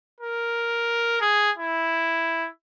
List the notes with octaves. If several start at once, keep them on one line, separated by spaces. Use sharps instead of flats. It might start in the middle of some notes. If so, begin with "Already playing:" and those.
A#4
G#4
E4